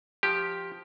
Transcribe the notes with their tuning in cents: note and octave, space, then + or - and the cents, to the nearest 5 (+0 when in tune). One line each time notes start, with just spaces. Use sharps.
F3 +0 G4 +0